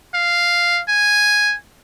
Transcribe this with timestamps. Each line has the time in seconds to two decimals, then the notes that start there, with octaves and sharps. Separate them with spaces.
0.14 F5
0.89 G#5